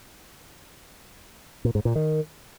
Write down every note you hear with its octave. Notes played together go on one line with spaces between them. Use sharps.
A#2
G#2
A#2
D#3